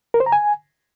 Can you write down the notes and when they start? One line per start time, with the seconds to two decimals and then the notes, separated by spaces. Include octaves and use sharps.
0.14 A#4
0.20 C5
0.26 A#5
0.32 G#5